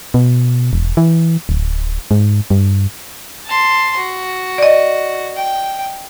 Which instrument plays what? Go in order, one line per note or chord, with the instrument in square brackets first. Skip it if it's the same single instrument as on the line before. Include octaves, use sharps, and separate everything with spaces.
[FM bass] B2
E1
E3
D1
G#2
G2
[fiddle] A5 C6
F#4
[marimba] D5 D#5
[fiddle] G5